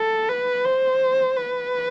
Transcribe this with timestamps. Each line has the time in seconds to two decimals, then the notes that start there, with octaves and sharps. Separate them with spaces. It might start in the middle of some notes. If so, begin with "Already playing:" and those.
Already playing: A4
0.29 B4
0.65 C5
1.37 B4